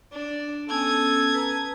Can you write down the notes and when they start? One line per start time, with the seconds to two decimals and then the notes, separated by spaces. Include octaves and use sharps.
0.12 D4 D5
0.70 B3 C#4 A4 G#5 D#6 G#6
1.34 B4 A#5